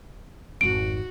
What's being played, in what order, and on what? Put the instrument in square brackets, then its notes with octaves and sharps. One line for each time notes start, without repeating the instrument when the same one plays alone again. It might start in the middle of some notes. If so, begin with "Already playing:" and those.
[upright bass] G#1 F2 [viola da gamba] F#4 [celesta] D7